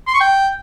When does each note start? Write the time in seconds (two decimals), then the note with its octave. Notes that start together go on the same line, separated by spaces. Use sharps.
0.07 C6
0.14 C#6
0.21 G5